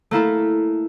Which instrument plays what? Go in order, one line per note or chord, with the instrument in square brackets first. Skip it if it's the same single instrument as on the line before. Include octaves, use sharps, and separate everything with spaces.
[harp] A3 A#3 E4 A4